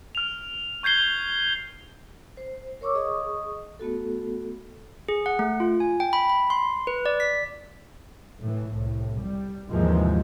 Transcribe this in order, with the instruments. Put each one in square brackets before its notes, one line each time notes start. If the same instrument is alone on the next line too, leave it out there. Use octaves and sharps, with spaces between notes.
[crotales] F6 F7
C#6 G6 G#6 C7 G7
[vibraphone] C5
A#4 C#5 C#6 D6 E6
G#4 D#5 C#6 D#6
A3 B3 F#4 A4
[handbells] G#4
F#5
A3
F4
G#5
G5
B5
B5
C6
B4
D5
B6
[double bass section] A2 E3
C2 A2
G3
D#2 G#2 C3 E3 F3 G#3